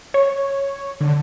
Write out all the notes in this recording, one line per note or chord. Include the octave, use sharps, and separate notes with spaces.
C#5
D3